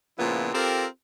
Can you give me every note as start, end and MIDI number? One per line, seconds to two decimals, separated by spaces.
0.19 0.52 46
0.19 0.52 49
0.19 0.52 53
0.19 0.52 59
0.19 0.52 60
0.19 0.52 64
0.54 0.86 60
0.54 0.86 65
0.54 0.86 67
0.54 0.86 69
0.54 0.86 70